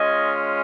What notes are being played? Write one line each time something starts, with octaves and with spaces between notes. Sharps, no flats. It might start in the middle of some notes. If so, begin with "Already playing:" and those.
Already playing: G#3 C#4 F4 D#5 G#5